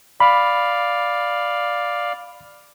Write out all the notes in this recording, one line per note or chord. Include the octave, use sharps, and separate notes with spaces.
D5 F5 B5